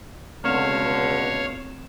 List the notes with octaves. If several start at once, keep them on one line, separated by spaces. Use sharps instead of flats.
C#2 B2 D3 A3 C4 C#5 F5 E7